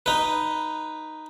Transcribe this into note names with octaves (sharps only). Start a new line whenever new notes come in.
D#4 B4